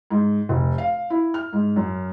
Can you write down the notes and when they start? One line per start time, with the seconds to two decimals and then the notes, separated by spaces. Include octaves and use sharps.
0.11 G#2
0.49 F1
0.78 F5
1.10 E4
1.34 F6
1.53 G#2
1.76 F#2